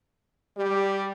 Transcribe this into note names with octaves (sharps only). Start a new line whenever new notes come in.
G3 G4